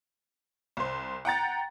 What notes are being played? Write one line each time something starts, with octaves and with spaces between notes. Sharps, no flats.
C2 C5
F#5 G5 A#5 A6